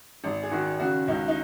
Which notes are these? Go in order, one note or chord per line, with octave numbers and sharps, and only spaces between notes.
G#1
G#4
D#3 F#4
C#3 F#4
C#2 D#4
D#4